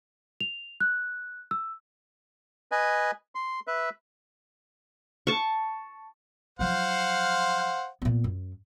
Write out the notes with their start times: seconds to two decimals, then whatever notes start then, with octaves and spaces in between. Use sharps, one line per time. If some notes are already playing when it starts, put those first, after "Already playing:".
0.40 F7
0.80 F#6
1.51 E6
2.72 B4 D#5 G#5
3.35 C6
3.67 B4 E5
5.27 A5 C#6
6.59 F3 F#3 C5 F5 F#5
8.02 A#2 B3
8.24 F#2